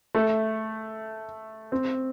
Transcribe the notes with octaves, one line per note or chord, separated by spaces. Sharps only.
A3
C4